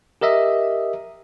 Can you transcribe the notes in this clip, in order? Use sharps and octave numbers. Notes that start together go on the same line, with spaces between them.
G4 A#4 D#5 E5